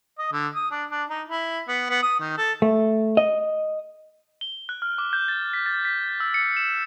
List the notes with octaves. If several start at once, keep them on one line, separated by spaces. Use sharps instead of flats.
D#5
D3
D#6
D4
D4
D#4
E4
B3
B3
D#6
D#3
A4
A3
D#5
G7
F#6
F6
D6
G6
A6
B6
A6
B6
E6
C#7
E7